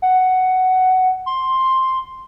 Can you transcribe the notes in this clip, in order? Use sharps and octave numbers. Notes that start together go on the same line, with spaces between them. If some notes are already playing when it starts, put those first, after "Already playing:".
F#5
C6